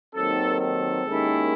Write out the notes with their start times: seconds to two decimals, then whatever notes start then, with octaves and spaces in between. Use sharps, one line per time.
0.14 D#2 D#3 F#3 C4 A4
0.59 A4
1.04 D#2 D#3 G#3 C#4 E4